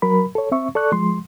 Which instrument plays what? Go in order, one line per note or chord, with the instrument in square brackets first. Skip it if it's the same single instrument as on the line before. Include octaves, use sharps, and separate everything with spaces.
[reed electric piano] F#3 A#4 B5
A4 C#5
C4 E5 C#6
A4 D5 C#6 F#6
F3 G#3 C6